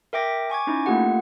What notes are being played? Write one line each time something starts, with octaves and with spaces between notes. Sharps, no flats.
A#4 E5 G5 D6 A#6
G#5 C#6 D6 G#6
C#4 D#4 E4
A3 A#3 F4 G4 F#5